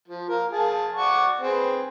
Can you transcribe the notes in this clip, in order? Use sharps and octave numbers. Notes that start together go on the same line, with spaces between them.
F3
A#4 F5
G#4 F5 A5
D5 F#5 C#6
C4 G#4 B4